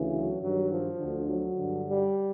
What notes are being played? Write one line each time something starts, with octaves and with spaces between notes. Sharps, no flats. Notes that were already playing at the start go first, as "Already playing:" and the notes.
Already playing: D2 C#3 E3
F#3
G2 D#3 F#3
F3
D2 D3
F#3
G2 D3
G3